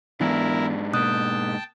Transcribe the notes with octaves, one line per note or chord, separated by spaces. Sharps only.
G#2 E3 B3 D4 E4 A#4
B2 A#3 G5 A5 D#6 F#6